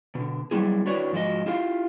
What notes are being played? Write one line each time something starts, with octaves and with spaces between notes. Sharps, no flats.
B2 D3
F#3 G3 B3 E4 G#4
D4 E4 F#4 B4 C#5 D5
G#2 F3 F#3 F#4 D#5
E4 F4 G4 B4 F5